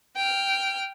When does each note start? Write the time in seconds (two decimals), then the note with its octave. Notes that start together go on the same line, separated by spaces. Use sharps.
0.16 G5 F6